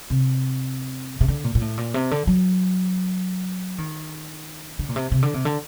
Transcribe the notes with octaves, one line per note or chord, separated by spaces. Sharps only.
C3
C3
D3
A#2
A#2
A2
A#2
C3
D3
F#3
D#3
D3
A#2
C3
C3
D3
C3
D3